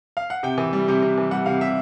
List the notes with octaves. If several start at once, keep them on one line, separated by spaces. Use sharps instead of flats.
F5
F#5
C3 G5
E3
G3
C3
C3
E3
G3 F#5
C3 F5
C3 E5